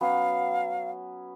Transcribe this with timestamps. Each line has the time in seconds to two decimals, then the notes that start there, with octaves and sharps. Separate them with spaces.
0.01 F#3 B3 C#4 F5